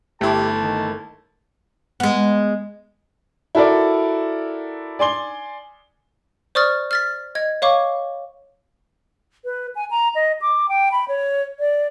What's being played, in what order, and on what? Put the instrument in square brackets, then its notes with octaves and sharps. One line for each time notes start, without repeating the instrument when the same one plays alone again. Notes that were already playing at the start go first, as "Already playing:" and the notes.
[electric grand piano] G1 E4 [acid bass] A3 [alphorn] G4 [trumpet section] A5
[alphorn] D#3
[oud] G#3 B3
[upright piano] E4 F#4 A4 A#4 D5
D5 G#5 C6 G7
[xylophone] C5 D5 C#6 D#6 F6 A6
F6 A6 B6
D#5 G#6
C#5 F5 C#6 D6
[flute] B4
G#5
A#5
D#5
D6
G5
B5
C#5
D5